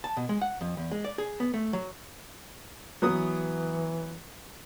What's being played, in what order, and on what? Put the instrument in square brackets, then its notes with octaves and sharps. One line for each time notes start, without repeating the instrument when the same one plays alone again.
[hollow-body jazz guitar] A5
B2
G#3
F#5
F2
E2
G#3
D5
G#4
B3
A3
F#3
[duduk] E3 [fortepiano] F#3 B3 D#6